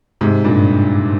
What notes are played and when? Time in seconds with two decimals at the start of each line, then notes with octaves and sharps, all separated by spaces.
0.21 G#2 C3
0.44 G2 A#2